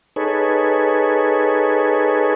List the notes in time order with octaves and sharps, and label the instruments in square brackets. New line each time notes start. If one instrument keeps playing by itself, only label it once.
[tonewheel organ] D#4 G#4 A4 B4 C#5